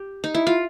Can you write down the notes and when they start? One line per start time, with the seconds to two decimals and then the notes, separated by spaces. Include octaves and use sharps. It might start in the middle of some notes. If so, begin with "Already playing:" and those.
Already playing: G4
0.24 D#4
0.35 E4
0.47 F4